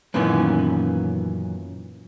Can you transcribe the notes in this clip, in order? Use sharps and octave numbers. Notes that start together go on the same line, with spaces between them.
F#2 A#2 D#3 E3 B3 C#4